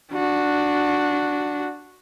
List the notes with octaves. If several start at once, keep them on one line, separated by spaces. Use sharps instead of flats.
D4 F#4